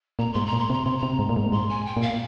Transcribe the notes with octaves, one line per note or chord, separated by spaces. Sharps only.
A#2 A#5
G#2 C6
A#5
A#2
C6
C3
A#5
C3 C6
C3 A#5
G#2
A#2
G#2
G#2 C6
G#5
G5
A#2
F5